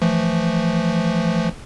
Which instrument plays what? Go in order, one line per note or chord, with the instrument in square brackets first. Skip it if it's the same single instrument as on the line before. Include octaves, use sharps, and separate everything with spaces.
[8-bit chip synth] E3 F3 A3